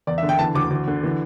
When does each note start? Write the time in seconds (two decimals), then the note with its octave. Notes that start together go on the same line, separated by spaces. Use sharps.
0.07 E2 D5
0.18 E5
0.23 D3
0.29 G5
0.39 E3 A5
0.54 D2 D6
0.70 D2
0.87 D3
1.03 E3